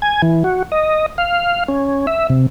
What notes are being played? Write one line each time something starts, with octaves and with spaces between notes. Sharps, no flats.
G#5
E3
F#4
D#5
F5
C#4
E5
C3